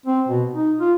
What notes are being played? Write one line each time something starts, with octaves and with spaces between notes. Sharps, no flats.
C4
B2
D#4
F4